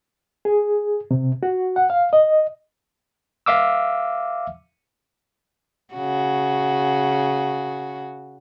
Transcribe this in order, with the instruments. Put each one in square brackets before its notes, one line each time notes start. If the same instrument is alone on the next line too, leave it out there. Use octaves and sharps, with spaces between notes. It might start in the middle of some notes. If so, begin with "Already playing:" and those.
[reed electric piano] G#4
C3
F#4
F#5
F5
D#5
[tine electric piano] E5 F5 D6 E6
[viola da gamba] C#3 F#4